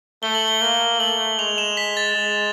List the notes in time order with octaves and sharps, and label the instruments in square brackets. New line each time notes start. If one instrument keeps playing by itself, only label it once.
[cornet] A3 [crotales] G7
[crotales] F#7
G7
[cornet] A#3
[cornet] A3 [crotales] F#7
[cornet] G#3 [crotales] F7
[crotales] E7
B6
A6
[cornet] G#3